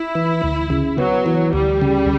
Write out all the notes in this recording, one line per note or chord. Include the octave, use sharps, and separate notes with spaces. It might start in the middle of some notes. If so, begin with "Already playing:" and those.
Already playing: E4
E3
D2
C#3
F#3 B3
E3
D2 G3
C#3